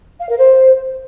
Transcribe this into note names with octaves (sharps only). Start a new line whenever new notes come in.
F5
A#4
C5